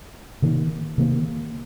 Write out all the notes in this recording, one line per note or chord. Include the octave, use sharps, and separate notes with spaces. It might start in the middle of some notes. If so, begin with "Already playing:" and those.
C3 D#3 A#3
C3 D#3 A#3